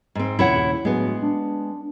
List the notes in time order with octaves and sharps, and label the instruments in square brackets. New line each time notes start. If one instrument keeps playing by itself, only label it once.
[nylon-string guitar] G#2 C4
[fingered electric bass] D#2 A#2 C#3 [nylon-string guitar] E4 C#5 F#5
[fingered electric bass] A2 F#3 [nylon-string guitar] G#3 B3
[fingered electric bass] D4